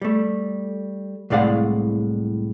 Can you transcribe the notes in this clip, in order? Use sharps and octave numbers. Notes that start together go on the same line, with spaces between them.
G3 A3
C2 A2 G#3 D5 F5 F#5